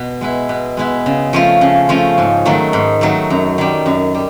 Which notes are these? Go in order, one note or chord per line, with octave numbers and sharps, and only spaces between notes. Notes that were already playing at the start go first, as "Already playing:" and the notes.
Already playing: B2
G#3 B3 E4
B2
G#3 B3 E4
C#3
F3 A3 C#4 F4
C#3
F3 A3 C#4 F4
G#2
D#3 F#3 A3
G#2
D#3 F#3 A3
F#2
D#3 G3
F#2
G3